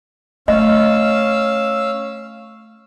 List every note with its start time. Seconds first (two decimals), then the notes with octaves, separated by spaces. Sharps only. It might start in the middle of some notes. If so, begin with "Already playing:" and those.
0.48 A3 C#4 D#5 F5 E6